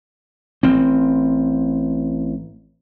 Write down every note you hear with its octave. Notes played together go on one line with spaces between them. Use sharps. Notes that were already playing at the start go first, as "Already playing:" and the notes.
A1 C4